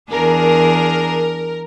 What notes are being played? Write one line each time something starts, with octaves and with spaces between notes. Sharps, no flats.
E2 D4 G#4 A#4